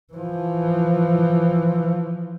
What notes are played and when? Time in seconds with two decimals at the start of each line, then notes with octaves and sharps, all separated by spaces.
0.13 E3 F3